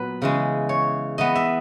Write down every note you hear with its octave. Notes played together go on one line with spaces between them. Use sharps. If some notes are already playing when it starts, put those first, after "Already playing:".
Already playing: A#2 F#3 B3 B4
C#3 E3 G#3
C#5
E3 B3 D#5
E5